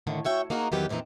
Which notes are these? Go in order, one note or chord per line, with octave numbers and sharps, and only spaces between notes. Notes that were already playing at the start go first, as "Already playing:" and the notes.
A2 D3 D#3
F#4 C#5 E5 G5
A#3 D#4 F#4 G#4 A#4
E2 G2 D#3 F#3 G4 B4
F2 A#2 E3 C4 D#4